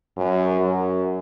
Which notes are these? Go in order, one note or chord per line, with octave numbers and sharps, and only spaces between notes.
F#2
F#2